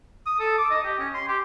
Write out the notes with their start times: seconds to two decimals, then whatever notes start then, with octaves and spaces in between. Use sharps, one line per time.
0.26 D#6
0.40 A4
0.58 D6
0.71 D#5
0.85 G4
0.99 C#4
1.14 C6
1.28 G4